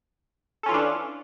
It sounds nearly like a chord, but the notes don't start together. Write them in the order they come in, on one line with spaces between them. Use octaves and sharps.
A4 C#4 F4 E3 D4